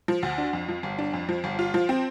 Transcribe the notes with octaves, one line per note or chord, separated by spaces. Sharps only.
F3
D2
D4
F2
F3
G1
D4
F2
F3
G1
F4
F3
C4